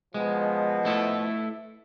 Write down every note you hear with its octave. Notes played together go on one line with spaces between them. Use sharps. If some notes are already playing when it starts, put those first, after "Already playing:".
B2 F3 G#3
A3 E4 A4